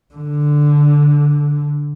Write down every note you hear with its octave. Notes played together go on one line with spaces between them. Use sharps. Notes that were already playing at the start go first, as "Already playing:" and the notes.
D3